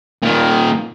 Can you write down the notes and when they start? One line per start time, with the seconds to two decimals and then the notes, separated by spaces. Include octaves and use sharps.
0.23 A#2 D#3